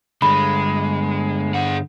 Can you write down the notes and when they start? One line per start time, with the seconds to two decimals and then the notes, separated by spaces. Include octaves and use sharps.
0.22 G2 D3 G#3 B5
1.54 G#4 F#5